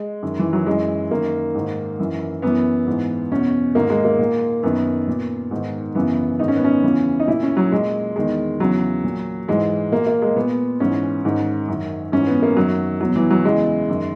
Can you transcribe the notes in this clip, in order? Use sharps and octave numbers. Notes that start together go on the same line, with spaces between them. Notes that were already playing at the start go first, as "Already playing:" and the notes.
Already playing: G#3
F#2 D#3
E3
F#3
F#2 E3 G#3
F#2 D#3 A#3
G#2
D#3
F#2 E3
F#2 E3 B3
G#2 E3
E2 B2 C#4
G#2 D#3 A#3
G#3
A#3
A#2
F#2 D#3 B3
A#2
G#2 D#3
F#2 C#3 E3 B3
G#2 D#3 D#4
C#4
B3
C#4
E2 C#3 E3
D#4
A#2 E4
C#4
F#3
A#2 G#3
E2 D#3 G#3
E2 C#3 E3 F#3
A#2
G#2 E3 G#3
A#2 A#3
A#3
G#3
A#2 B3
G#2 E3 C#4
G#2 D#3
F#2 D#3
G#2 E3 C#4
B3
A#3
F#2 D#3 F#3
E2 B2 F#3
E3
F#3
E2 C#3 E3 G#3
F#2 D#3